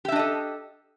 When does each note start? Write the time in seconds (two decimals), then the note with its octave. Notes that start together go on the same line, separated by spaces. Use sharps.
0.05 G4
0.08 E5
0.12 D4
0.16 D#5
0.19 A4